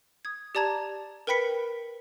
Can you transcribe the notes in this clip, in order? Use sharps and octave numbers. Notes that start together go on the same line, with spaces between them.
D#6 G#6
G4 D5 A5 A#5 G#6
A#4 B4 G5 B5 B6 C#7